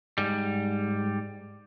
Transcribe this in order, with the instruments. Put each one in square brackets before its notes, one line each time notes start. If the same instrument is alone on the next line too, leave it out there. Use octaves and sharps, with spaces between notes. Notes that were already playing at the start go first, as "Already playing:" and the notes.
[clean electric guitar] G#2 G3